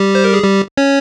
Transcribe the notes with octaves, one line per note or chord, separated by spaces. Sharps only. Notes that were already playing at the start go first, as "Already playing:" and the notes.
Already playing: G3 G4
C5
A#4
G#4
G3 G4
C#4 C#5